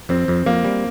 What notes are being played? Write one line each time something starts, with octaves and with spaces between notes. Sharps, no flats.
F2 C4
F2
F2 A#3
G3